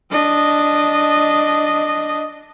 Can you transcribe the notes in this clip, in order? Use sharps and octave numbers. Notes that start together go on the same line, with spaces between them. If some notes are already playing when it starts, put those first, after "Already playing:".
D4 D#5